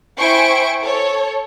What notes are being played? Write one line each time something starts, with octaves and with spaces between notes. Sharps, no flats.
E4 C5 G5 G#5 C#6 D7
A4 C#5